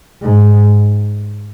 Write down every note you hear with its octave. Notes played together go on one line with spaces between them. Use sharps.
G#2